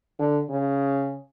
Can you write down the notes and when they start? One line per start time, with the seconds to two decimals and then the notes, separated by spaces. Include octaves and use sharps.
0.19 D3
0.49 C#3